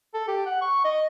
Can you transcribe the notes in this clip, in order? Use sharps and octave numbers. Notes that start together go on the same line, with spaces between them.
A4
G4
F#5
C#6
D#5